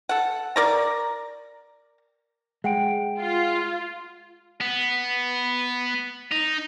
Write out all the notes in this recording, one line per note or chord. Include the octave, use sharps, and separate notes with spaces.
A4 F#5
A#4 D5 A#5
G#3 F#5 G5 D7
F4
B3
D#4